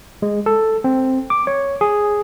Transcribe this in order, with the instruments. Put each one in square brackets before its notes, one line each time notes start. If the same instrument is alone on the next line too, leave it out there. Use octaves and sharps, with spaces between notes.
[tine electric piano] G#3
A4
C4
D6
C#5
G#4